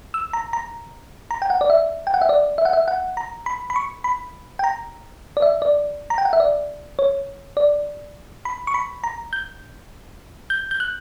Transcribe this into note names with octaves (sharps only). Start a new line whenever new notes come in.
E6
A#5
A#5
A#5
G5
F#5
D5
E5
G5
F#5
E5
D5
E5
F#5
E5
F#5
A#5
B5
B5
C#6
B5
G5
A#5
D5
E5
D5
A#5
G5
F#5
E5
D5
C#5
D5
B5
C#6
B5
A#5
G6
G6
G6
F#6